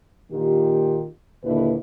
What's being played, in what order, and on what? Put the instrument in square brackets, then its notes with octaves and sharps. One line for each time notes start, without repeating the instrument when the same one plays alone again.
[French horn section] A#2 D#3 F4 G4
D#2 A#2 D3 D#4 E4 B4